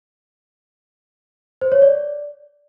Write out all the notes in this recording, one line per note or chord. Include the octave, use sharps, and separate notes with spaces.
C5
C#5
D5